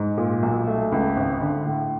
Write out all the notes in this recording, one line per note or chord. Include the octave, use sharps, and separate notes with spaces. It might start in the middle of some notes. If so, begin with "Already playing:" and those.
Already playing: G#2
A#2
B1
A3
C#2
G#1
D3
A2